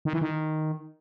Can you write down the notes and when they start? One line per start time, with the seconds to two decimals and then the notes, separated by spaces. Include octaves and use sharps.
0.05 D#3
0.13 E3
0.21 D#3